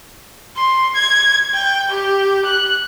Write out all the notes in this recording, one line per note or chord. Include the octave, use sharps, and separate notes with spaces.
C6
G#6
G5
G4
F#6